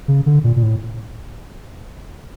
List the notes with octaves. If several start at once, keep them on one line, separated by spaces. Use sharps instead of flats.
C#3
D3
A#2
A#2
A2